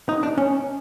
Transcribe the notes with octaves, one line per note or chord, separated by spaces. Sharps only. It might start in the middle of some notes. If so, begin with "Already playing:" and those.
D#4
D4
C#4